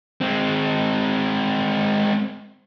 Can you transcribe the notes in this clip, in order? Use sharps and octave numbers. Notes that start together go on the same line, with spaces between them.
G#3 C4